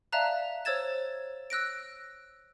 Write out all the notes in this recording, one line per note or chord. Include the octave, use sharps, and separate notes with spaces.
D5 E5 F5 A5 A#5 F#6
C5 C#5 E6 G#6 A6 E7
E6 F#6 A#6 D7